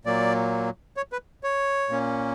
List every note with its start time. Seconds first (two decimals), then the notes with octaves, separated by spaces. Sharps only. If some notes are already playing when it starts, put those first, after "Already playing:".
0.05 A#2 F#3 A#3 D5
0.97 C#5
1.12 B4
1.44 C#5
1.89 A#2 A#3 C#4